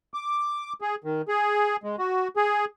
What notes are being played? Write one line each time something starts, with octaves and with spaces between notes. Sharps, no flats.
D6
G#4
D#3
G#4
G#3
F#4
G#4